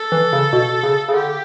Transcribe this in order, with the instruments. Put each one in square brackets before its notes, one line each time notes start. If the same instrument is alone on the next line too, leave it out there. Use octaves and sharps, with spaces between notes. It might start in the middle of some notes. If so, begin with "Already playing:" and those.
Already playing: [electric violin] A4
[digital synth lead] E3
C#3
B2
C#3
C#3
[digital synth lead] D3 [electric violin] G4